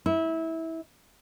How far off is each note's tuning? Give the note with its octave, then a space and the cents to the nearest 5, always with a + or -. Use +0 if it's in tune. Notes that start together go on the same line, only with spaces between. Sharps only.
E4 -20